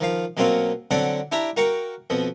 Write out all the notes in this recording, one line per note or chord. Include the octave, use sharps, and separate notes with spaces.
D#3 F3 F5
B2 F#3 A#3 C4 F4
D3 F#3 C4 D4 D5 F#5
D4 E4 G4 E5 A#5
F#4 A#4 F5 G5 C#6
F2 B2 B3